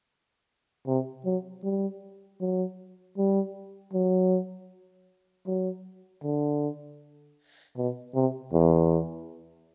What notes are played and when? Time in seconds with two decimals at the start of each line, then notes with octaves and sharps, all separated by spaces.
0.87 C3
1.25 F#3
1.64 G3
2.41 F#3
3.18 G3
3.93 F#3
5.47 F#3
6.24 D3
7.77 B2
8.15 C3
8.53 E2